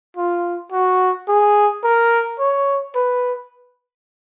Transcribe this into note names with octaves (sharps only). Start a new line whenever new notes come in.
F4
F#4
G#4
A#4
C#5
B4